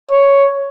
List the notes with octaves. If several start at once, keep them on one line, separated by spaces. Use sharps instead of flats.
C#5